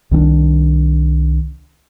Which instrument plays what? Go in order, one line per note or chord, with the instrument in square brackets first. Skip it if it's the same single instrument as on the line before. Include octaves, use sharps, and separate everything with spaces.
[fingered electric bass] C2 D#3 C4 D4